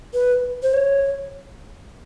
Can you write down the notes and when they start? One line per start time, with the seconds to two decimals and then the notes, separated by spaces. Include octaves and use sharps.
0.14 B4
0.63 C5
0.74 C#5